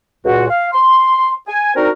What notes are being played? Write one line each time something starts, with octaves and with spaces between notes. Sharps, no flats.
C#2 A#2 F#4
F5
C6
G#5
C4 D4 D#4 F#4 A#4